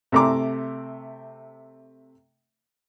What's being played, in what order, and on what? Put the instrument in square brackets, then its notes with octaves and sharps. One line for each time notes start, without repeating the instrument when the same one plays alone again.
[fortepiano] C3 A3 A#5 C6 D6